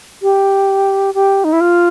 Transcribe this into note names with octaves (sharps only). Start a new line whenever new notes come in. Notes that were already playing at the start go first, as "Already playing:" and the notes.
G4
G4
D#4
E4
F4